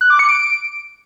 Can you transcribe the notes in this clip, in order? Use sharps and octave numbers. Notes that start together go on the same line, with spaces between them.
F#6
D6
C#7
D7